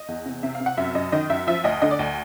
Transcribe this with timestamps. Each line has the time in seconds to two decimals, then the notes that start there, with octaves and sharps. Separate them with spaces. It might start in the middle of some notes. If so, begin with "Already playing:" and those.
Already playing: D#5
0.08 E2
0.26 C3
0.43 C3 E5
0.55 F5
0.60 C3
0.66 F#5
0.77 F#2 E5
0.95 F#2 D#5
1.12 D#3 D#5
1.30 F#2 E5
1.47 F3 E5
1.64 D2 D#5
1.82 D3 D#5
1.91 D5
1.99 D2